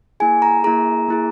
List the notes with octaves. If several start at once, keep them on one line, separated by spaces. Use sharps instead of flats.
A#3 E4 G#4 G#5
A#5
A#3 E4 G#4 A#5
A#3 E4 G#4